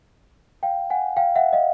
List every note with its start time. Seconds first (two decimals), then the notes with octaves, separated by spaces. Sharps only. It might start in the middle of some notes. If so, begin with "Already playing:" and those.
0.63 F5 G5
0.90 F#5 G#5
1.17 F5 G5
1.35 E5 F#5
1.53 D#5 F5